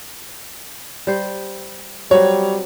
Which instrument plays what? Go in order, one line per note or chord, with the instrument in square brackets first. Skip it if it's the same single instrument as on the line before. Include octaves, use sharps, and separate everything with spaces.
[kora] G3 C5
[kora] F#3 C4 [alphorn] G3 [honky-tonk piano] C#5